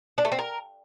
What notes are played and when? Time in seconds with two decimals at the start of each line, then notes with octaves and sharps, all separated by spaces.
0.18 D4
0.25 A3
0.32 C4
0.39 A#4